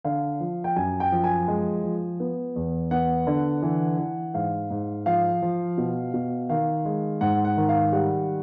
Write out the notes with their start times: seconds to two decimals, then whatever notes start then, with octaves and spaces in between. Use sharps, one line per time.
0.04 D3 F5
0.40 F3
0.64 G5
0.76 F#2 G#5
1.00 G5
1.12 F3
1.24 G#5
1.48 G#3
1.84 F3
2.20 B3
2.56 E2
2.91 B3 F#5
3.27 D3
3.62 E3
3.98 E3
4.34 G#2 F5
4.70 G#2
5.06 F3 F5
5.42 F3
5.78 B2
6.14 B2
6.49 D#3 F5
6.85 G#3
7.21 G#2 F#5
7.45 F#5
7.57 D#3
7.69 F5
7.92 G3 F#5